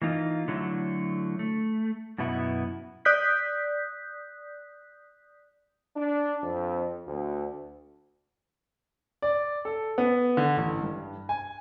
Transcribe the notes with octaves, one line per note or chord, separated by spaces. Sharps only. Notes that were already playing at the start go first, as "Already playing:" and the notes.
E3 A#3 D#4 F4
D3 F#3 A3 E4
A3
F#2 B2 B3 E4
D5 D#6 F#6 G6 B6
D4
F2
D2
D5
A4
B3
D3
A1
G2
G#5